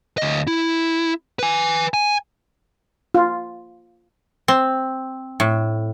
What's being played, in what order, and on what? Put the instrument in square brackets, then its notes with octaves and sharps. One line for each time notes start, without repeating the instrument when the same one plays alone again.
[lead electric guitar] D2 D#5
E4
B4 G#5
G#5
[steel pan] F4
[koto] C4
A2